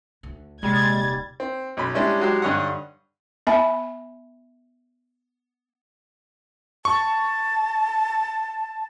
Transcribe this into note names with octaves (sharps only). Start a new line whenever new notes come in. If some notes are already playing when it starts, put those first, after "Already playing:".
D2
D#1 C3 G3 G#3 G#6 A6
C4
B1 C#4 B5
G3 G#3 C#4 D4 E4
F#3 G#3 F#4 G4
G2 D3 C#5 D#5 F#5
B3 E5 G#5 B5
A5 C#6